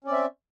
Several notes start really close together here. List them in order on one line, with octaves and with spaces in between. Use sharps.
C#4 D5 C4 E5